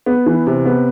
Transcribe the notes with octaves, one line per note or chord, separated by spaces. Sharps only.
B3
E3
C3
B3